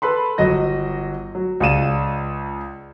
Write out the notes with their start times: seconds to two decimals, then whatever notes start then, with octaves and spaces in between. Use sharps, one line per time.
0.02 A4 B4 B5 C6
0.38 G1 F#3 D#5 A#6
1.35 F#3
1.60 C#2 G#3 F4 D5 D#7 E7